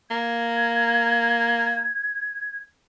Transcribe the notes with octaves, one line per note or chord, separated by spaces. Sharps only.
A#3 G#6